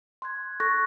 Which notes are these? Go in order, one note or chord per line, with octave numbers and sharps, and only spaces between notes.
C6 F#6 G#6
A4 C#6 F#6 A6 A#6